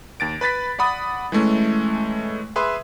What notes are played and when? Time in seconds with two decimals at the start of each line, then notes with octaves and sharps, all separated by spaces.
0.20 D#2 A6 D7
0.41 B4 B5 A6 B6
0.79 D5 F#5 B5 D#6
1.32 E3 G#3 A3 C#4
2.56 G#4 B4 E5 C6